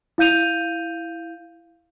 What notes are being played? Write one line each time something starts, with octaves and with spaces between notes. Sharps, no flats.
E4 F5 G6 D#7 F7